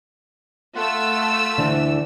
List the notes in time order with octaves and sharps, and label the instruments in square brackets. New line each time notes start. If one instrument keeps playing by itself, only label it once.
[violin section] A3 E6 [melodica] F4 F#5
[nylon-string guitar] D2 D3 E3